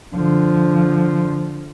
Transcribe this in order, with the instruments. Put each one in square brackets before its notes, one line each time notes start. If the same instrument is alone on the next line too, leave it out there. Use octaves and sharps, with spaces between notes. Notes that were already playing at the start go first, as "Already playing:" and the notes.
[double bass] D3 F3